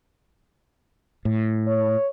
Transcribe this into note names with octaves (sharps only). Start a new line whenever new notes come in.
A2
C#5